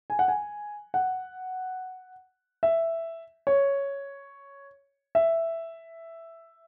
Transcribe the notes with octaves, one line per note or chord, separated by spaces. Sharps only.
G#5
F#5
G#5
F#5
E5
C#5
E5